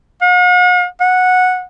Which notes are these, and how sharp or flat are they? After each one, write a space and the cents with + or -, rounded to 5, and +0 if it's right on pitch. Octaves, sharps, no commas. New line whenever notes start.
F#5 -45
F#5 -10